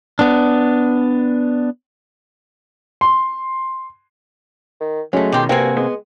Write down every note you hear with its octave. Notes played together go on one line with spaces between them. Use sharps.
B3 D4
C6
D#3
F#3 G#3 A3 C#4
B2 D#3 G4 G5 C6
G2 C3 A#3 C4 F#4 G5 G#5
G#3 B3